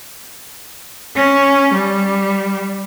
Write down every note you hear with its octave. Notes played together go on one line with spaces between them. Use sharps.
C#4
G3